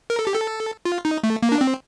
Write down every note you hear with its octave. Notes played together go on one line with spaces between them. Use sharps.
A#4
A4
G4
A4
F4
D#4
A3
A#3
D4
C4